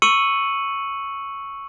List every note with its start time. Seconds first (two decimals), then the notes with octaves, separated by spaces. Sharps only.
0.02 C#6 E6 C#7 D#7 F#7